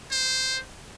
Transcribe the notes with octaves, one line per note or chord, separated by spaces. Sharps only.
C5